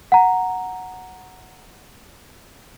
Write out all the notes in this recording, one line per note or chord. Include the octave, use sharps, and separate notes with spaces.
F#5 A#5